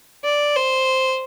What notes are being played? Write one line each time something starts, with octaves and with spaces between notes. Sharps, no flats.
D5
C5